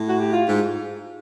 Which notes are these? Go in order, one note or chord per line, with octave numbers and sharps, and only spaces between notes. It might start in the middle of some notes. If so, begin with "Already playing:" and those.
Already playing: A2
F#4
G4
F4
G#2